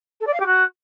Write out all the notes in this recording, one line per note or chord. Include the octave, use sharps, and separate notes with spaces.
A4
D5
F5
G4
F#4